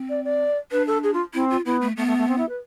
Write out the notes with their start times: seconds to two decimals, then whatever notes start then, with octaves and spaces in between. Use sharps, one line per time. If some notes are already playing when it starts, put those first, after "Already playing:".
Already playing: C4
0.09 D5
0.25 D5
0.72 D4 B4
0.87 A4
1.03 G#4
1.14 F4
1.34 C4 E4
1.50 F4
1.65 B3 E4
1.81 A3
1.97 A3 B3
2.07 A3
2.18 A3
2.28 C4
2.38 E4
2.49 B4